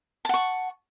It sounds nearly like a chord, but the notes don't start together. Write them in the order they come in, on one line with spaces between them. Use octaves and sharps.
A5 F#5 C#6